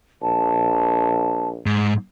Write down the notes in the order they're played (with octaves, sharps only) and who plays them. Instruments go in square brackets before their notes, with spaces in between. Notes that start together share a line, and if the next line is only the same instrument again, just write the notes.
[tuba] A#1 [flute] A5
[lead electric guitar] G#2